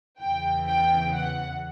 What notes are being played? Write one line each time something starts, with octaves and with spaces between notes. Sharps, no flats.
E2 C#3 E3 G5
G5
F#5